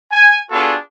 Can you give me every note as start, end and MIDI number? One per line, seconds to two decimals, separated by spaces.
0.12 0.38 80
0.50 0.75 59
0.50 0.75 62
0.50 0.75 65
0.50 0.75 66
0.50 0.75 68
0.50 0.75 69